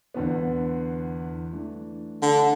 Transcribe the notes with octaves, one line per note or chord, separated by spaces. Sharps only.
E2 D3 B3
E3 A3 D4
D3